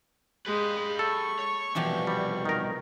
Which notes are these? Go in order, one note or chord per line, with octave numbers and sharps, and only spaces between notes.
G#3 G4 B4
A4 C#6
C#5
C2 B2 E3 F3 G4
G3
D#3 A#4